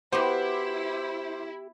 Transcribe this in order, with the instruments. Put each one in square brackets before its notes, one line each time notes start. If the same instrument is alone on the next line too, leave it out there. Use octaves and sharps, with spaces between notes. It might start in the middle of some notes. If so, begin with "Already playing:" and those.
[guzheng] B3 F#4 [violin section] E4 [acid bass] G4 [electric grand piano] C5 D6